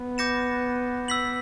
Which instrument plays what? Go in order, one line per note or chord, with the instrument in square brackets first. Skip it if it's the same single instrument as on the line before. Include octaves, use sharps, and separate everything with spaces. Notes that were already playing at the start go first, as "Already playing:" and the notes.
Already playing: [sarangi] B3
[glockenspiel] D6 G6 A#6 C#7 E7
E6 B6 F#7